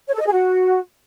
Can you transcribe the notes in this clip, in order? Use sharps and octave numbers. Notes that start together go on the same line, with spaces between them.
C#5
A4
D#5
G#4
F#4